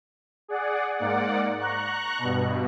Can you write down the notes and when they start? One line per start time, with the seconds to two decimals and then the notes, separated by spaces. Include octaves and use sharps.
0.48 G#4 D5 F#5
0.98 G#2 A#3 D5 F#5
1.59 A#5 C#6 F#6
2.19 G2 B2